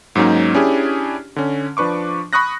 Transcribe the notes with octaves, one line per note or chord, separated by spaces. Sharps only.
G#2 F#3 A#3 C#4 D#4
C#4 D4 E4 G4 G#4
D3 C#4
F3 D4 B4 C#6 D6
B5 C#6 D#6 F#6 A#6